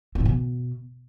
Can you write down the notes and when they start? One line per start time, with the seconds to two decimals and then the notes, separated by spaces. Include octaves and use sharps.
0.15 C4
0.20 A2
0.25 B2